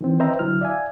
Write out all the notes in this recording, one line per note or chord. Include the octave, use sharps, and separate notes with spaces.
D#3 E3 C4
B4 C5 D#5 E5 G5 A#5
C2 D3 F#3 E4 F6
D5 E5 F5 G#5